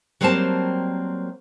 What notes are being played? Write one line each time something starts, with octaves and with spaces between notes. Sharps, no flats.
F#3 G3 A#3 C4 C5 A5